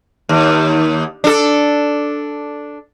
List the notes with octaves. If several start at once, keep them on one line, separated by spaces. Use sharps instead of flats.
D#2
D4 A4